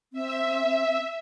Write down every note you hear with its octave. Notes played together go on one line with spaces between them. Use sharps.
C4 E5